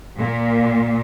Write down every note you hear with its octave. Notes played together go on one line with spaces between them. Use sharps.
A#2